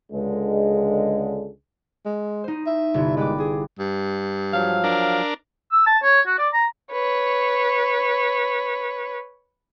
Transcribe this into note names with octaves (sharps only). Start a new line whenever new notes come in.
C#2 D3 G#3
G#3
D#4 C5
E5
G1 C3 E4
G#3 B4 G5 D6
G#4
G2
F3 F#3 F5
D4 A#4
E6
A5
C#5
F#4
D5
A#5
B4 C#5